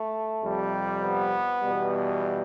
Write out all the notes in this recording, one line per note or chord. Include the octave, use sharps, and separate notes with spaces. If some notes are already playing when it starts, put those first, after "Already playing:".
Already playing: A3
F2 C3 G3
B3
E2 B2 G3